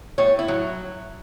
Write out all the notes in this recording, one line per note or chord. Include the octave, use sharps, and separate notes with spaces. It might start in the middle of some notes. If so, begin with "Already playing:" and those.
A2 C#5
E4
F#3